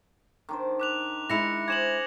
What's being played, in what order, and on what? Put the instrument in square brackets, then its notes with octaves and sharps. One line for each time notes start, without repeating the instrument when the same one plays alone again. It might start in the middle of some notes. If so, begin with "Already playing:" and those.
[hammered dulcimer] D#3 D4 C5
[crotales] D6 F#6 F7
[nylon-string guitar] G#3 E4 [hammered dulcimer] B5 [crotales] A#6 C#7 F7
[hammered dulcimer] G#4 C5 D6 [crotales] G#6 E7 F#7